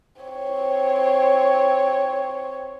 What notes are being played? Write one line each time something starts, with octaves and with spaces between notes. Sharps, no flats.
C4 C#5